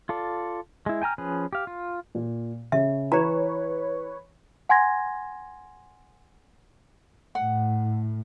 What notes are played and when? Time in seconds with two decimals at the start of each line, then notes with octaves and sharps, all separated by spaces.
0.09 F4 A4 D5
0.86 G#3 E4
1.02 G5 G#5 A#5 F6
1.18 F3 C#4 G#4 B4
1.53 G4 F5
1.67 F4
2.15 A#2
2.72 C#3 C#4 E5
3.12 E3 B4 C#5 A#5
4.69 F#5 G#5 C6 G#6 A#6
7.35 A2 F#5